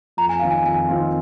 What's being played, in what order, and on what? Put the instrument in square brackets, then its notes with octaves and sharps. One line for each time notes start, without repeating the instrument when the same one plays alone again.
[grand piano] F2 [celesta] A#5
[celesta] G#5
[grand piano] D#3 C4 F4 [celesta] F5
[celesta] G#5
[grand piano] F2 [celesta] G#5
[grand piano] D#3 C4 F4